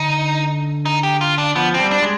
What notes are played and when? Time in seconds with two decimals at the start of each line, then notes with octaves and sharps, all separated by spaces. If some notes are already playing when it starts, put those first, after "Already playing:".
Already playing: D3 D#4
0.86 D#4
1.03 G4
1.21 F4
1.38 D4
1.55 F3 B3
1.74 C4
1.79 G3
1.91 D4
2.03 G#3